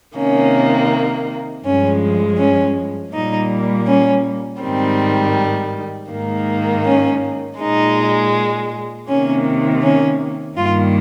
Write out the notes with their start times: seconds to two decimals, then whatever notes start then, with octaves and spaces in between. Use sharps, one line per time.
0.15 C3 D#3 A#3 C#4
1.64 G2 F3 G#3 C#4
2.38 C#4
3.13 A#2 G3 A#3 D#4
3.88 C#4
4.62 G#2 D#3 G3 C4
6.10 G#2 D#3 A#3
6.85 C#4
7.59 A#2 G#3 D#4
9.08 C3 D#3 A#3 C#4
9.83 C#4
10.57 G2 D#3 G3 A#3 F4